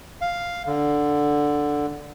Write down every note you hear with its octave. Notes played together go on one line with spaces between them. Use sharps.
F5
D3